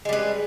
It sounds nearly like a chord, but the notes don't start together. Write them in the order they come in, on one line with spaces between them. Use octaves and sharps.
G#3 G3 B4